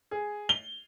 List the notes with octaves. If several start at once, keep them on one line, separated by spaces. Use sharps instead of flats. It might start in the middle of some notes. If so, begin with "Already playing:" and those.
G#4
G7